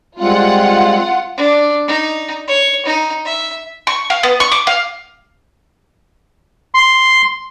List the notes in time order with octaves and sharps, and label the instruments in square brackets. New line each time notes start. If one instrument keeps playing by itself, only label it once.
[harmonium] G3 G#3 C4 [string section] F4 F#5
[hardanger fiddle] D4
D#4
C#5
D#4
E5
[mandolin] C#6
F5
B3
C#6
D6
F5
[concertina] C6